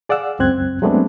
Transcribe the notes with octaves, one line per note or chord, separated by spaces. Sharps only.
G#4 D5 F5 F#5 E6
C#2 F#2 C4 F#6 G#6
F#3 G#3 A3 B3 C4 D4